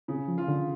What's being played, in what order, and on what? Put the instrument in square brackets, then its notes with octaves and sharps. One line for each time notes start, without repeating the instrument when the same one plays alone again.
[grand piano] C#3
[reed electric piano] F3
[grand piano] F4
[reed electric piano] D3